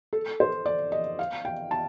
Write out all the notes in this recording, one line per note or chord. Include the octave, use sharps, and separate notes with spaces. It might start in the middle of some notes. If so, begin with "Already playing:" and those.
A4
C5
D5
D#5
F5
G5
A5